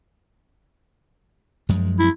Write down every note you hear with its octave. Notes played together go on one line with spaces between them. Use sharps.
F#2 F3 G#3
E4